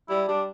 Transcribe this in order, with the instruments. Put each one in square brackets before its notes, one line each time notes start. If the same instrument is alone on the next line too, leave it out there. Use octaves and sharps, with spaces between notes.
[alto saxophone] G3 [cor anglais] E4
[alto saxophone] G3 [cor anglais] D4